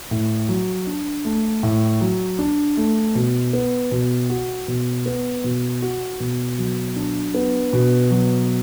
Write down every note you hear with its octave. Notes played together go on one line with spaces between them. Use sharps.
A2
F#3
D4
A3
A2
F#3
D4
A3
B2
B3
B2
F#4
B2
B3
B2
F#4
B2
F#3
D4
B3
B2
F#3